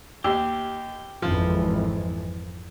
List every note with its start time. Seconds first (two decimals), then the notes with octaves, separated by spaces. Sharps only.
0.24 D#2 G4
1.22 G#1 F2 E3 F3